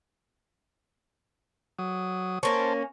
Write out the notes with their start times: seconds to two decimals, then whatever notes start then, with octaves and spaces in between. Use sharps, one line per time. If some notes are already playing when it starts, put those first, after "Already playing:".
1.79 F#3 D#6
2.43 A#3 C#4 C5 A5